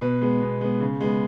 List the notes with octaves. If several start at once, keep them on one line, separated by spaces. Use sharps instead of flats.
B2 B4
G#3 B3
B2
G#3 B3
C#3
G#3 B3